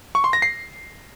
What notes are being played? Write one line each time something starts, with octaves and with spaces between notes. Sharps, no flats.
C#6
C6
A#6
C7